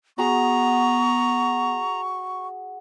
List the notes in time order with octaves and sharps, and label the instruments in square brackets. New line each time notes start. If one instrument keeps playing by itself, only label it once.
[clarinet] B3 [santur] F#4 G#4 [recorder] A#5 [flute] C#6